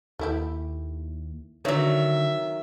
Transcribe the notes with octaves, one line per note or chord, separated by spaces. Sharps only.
D#2 A3 E4 G4
D3 D#3 F#3 C#5 D5 E5